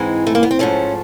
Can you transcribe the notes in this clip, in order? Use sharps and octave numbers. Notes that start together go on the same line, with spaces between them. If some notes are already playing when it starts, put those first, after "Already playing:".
Already playing: G#2 E3 G#3 C4
A3
A#3
B3
C4
G#2 F3 A3 C#4